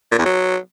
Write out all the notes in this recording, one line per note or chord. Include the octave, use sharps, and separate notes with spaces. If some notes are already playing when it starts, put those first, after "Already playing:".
A#2
E2
F#3